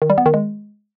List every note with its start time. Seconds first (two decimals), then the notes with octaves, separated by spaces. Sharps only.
0.02 D#3
0.10 G3
0.18 B3
0.26 D#3
0.34 G#3